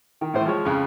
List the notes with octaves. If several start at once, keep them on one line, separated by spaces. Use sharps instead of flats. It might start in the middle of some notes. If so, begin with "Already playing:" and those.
D#3
A2 E3 C5
F3 G#3 C#5
F2 C#3